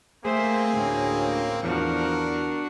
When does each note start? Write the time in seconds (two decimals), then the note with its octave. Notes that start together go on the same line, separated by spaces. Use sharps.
0.25 A3 A#3 C4 G#4 C5 E5
0.73 D2 A2 C#4
1.63 E2 D3 F3 D4 F#4 A#4